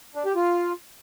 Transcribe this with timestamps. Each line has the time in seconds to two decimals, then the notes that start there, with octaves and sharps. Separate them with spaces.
0.15 D4
0.25 G4
0.36 F4